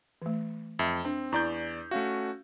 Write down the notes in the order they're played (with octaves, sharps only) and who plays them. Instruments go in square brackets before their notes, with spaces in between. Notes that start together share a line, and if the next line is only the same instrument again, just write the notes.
[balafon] E3 A3
[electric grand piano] F2 [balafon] E5
[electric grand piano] C4 [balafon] D4
[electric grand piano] E2 D5 G6 [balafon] E4 A#5 C#6
[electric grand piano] A3 C#4 F#4 [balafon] F5